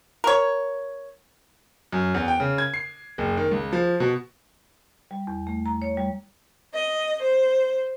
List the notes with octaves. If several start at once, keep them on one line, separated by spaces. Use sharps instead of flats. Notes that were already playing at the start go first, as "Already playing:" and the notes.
A#4 C#5
F#2
E2
G5
C#3
G#6
C7
F#1
D#3
C#2
F3
B2
G3
E2
A3
A#5
C#5
G3
D#5
C5